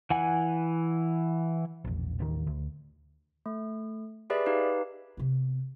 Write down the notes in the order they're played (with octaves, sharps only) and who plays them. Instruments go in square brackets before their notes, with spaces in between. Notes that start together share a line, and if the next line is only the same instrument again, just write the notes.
[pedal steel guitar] E3 F#5 G#5
[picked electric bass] E1 A#1
A1 D#2 D#3
D2
[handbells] A3
G4 G#4 B4 D5 E5 B5
D#4 G4 B4 F5
[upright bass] C3 B3